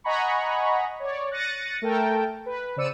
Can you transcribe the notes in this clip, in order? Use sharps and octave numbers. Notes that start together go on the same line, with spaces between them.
D#5 F#5 G#5 A#5 B5 C#6
C#5 D5
F#6 A6 A#6 C#7 D#7
A3 A4 A#4 G5 A5
B4
C#3 C5 D5 E6 C#7 D#7